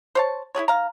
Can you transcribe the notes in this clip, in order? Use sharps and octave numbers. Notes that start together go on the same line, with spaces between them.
C5 C#5 A5
E4 G4 G#4 C#5
D#3 F5 A#5